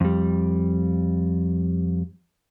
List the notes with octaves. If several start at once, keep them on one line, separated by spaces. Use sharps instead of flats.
F2 G3